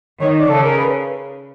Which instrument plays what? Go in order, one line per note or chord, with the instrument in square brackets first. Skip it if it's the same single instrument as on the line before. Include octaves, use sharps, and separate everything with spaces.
[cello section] D#3 [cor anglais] C#5
[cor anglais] D5
[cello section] C#3 [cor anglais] A4
[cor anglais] A#4
B4